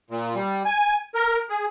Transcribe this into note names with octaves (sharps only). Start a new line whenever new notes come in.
A#2
G3
G#5
A#4
G#4